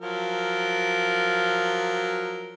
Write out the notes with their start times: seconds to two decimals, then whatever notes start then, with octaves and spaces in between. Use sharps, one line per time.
0.01 F3 F#3 A#4